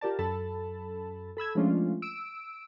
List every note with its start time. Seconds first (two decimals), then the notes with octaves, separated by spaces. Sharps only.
0.01 F4 G4 A#4 D5 A5
0.19 F#2 A4 A5 B5
1.37 A4 B5 E6 G#6
1.55 F3 G#3 A3 C#4 D4 F4
2.02 E6 D7